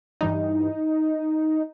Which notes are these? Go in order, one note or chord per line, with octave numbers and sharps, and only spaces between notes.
G2 E3 G3 D#4